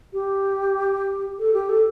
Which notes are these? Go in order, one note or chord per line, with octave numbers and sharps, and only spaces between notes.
G4
A4
G4
A4